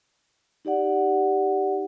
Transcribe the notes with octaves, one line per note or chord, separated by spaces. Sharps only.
D#4 G4 D5 F#5